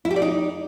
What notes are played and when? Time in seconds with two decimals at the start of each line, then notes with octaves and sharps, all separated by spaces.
0.05 E4
0.11 G4
0.16 D5
0.22 D#4